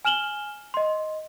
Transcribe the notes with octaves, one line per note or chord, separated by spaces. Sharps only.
G#5 F6 E7 F#7 G7
D#5 C6